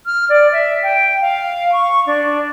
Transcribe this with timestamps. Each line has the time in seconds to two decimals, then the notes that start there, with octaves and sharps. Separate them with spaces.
0.06 F6
0.29 D5
0.52 E5
0.83 G5
1.21 F5
1.72 C#6
2.07 D4